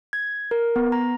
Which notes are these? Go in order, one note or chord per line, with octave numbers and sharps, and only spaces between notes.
G#6
A#4
B3
A#5